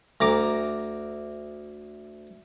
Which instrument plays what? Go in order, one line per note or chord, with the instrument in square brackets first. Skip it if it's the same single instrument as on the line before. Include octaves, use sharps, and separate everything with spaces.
[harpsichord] D2 A#5 D6